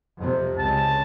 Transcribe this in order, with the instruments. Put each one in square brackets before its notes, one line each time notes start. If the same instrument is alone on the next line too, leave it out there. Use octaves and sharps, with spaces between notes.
[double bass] F2 C3
[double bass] C#2 [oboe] A5